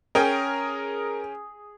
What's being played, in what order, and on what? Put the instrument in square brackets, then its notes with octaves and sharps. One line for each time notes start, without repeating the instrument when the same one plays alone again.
[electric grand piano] C#4 G5 G#5 [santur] G#4 [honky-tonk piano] A#4